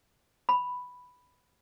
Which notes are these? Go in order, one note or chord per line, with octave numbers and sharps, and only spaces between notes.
B5